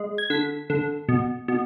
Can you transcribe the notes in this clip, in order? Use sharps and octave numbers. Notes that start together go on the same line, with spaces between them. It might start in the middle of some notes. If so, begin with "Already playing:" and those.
Already playing: G#3
G#6
D3 B6
D3
B2
B2